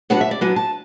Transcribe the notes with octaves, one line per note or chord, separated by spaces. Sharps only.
F#3 B3 D4 F#5
E5
D5
F#3 B3 D4 G#5
A5